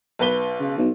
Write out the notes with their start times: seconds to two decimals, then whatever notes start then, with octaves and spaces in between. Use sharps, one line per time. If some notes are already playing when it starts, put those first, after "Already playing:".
0.19 B1 B4 G7
0.60 C#3
0.78 B1